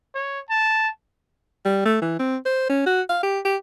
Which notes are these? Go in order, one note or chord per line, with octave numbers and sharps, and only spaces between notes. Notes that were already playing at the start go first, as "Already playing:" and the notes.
C#5
A5
G3
A3
E3
C4
C5
C#4
F#4
F5
G4
G4